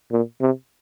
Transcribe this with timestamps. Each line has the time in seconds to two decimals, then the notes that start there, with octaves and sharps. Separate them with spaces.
0.12 A#2
0.41 C3